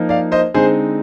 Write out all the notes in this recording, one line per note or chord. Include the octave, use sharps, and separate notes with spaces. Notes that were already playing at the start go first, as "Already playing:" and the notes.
Already playing: F3 A#3 D#4
D5 F5
C5 D#5
D3 G#3 C4 D#4 G#4 C5